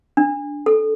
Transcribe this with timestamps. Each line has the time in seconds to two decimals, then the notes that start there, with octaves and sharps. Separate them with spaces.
0.17 D4
0.66 A4